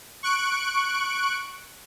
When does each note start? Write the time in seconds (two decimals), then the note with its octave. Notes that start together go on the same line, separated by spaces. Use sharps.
0.23 C#6 F#6 D7